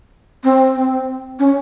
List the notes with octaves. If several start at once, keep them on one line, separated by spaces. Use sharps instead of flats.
C4
C4
C#4